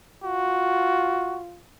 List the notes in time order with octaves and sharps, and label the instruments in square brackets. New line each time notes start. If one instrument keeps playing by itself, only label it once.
[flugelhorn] F4 [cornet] F#4